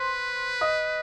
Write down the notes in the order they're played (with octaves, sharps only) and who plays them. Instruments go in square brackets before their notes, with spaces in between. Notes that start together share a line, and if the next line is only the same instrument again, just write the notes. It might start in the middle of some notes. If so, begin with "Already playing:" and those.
Already playing: [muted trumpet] B4 [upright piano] C5 C6
[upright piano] D#5 D#6